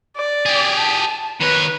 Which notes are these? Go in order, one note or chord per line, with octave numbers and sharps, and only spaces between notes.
D5
G4 G#4
A5
D#3 B4 C#5